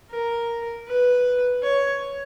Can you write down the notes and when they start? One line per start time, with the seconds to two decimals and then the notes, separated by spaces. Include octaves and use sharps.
0.11 A#4
0.87 B4
1.63 C#5